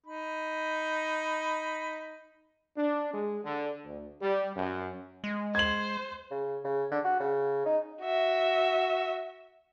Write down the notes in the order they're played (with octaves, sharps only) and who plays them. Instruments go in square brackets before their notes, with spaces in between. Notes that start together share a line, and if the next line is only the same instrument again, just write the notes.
[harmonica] D#4 B5
[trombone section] D4
G#3
D3
D2
G3
F#2
[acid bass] G#3
[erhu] C5 [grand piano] G#6 F#7
[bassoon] C#3
C#3
D3
F#4
C#3
D#4
[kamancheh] F#4 E5